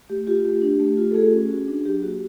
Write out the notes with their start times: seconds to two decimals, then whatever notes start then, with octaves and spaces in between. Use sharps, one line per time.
0.10 A3 G4
0.27 F4 G4
0.45 A3 G4
0.62 D4
0.80 A3
0.97 F4
1.11 A4
1.15 A3 G#4
1.33 C#4
1.51 F#4
1.68 D4
1.85 F#3 G4
2.03 A#3 F#4